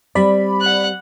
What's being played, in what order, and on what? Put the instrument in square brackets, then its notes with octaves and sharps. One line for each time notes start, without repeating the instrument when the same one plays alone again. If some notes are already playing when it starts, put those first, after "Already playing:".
[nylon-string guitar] G3 C4 [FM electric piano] D5 B5
[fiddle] F#5 F#6